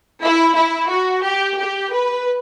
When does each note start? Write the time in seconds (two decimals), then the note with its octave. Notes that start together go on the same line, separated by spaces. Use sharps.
0.22 E4
0.56 E4
0.89 F#4
1.23 G4
1.57 G4
1.91 B4